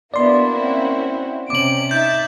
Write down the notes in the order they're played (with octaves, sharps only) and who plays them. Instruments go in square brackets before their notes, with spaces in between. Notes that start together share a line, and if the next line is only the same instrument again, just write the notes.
[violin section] A#3 E4 F#4 [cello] B3 D4 [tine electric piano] D5 C6
[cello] C4 C#4
[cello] C3 C#4 [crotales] D6 F#7 [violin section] D7
[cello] D#4 [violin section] E5 A6 [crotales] G6